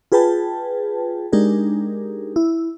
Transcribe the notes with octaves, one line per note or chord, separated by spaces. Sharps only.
F4 G#4 B4 G5 A5
G#3 D4 D#4 G4 G#4 A#4
E4